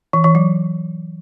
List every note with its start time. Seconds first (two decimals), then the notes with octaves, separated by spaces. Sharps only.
0.13 E3
0.24 E3
0.35 F#3